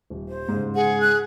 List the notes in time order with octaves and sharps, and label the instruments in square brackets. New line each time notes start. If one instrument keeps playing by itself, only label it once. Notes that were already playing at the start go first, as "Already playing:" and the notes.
[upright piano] D#1
[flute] C5
[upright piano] G#2 C#3
[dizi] G#4 [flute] F#5
[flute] F#6